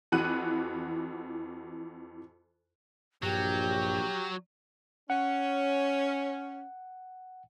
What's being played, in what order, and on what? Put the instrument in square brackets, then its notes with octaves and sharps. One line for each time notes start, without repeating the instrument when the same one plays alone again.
[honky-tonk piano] F2 E3 F#4 B5 F#6 D#7
[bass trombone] A#1 [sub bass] G2 [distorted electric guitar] F#3 [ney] G4
[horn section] C#4 [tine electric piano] F#5